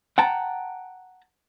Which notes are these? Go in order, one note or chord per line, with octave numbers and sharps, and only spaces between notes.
F#5 G5 A5 A#5